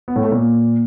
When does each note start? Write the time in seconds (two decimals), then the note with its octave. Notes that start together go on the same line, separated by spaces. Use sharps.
0.08 B3
0.16 A2
0.24 A3
0.32 A#2